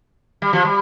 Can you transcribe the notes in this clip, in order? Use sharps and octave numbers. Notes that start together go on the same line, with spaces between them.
G3
F3
G3